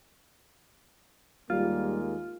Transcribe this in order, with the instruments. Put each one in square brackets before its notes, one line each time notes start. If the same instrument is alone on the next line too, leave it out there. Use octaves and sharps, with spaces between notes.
[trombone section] D#2 G#3 A#3 [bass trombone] G3 [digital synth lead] F4